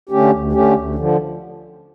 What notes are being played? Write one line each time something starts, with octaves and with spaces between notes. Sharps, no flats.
D3 A3 C#4 G4
D2
D3 A3 C#4 G4
D2
D3 F3